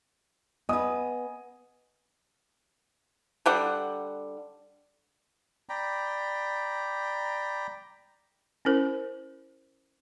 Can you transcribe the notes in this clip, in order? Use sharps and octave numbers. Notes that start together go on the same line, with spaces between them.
B3 B4 D#5 G#5 D#6
D3 G3 F#5
D5 G5 A#5 B5
C#4 E4 A#4 C5